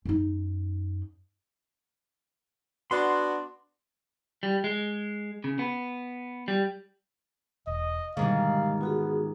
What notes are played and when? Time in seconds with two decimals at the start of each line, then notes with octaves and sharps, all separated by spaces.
0.05 F#2 D#4
2.91 B3 D4 F#4 C6
4.43 G3
4.64 G#3
5.44 C#3
5.59 B3
6.48 G3
7.67 E1 D#5
8.17 G#2 B2 D3 D#3 G3 G#3 D#5 F5
8.81 B3 F4 F#4 G#4